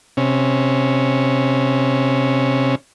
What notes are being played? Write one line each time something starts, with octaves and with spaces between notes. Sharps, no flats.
C3 C#4